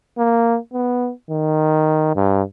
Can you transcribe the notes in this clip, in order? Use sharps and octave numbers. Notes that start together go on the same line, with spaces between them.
A#3
B3
D#3
G2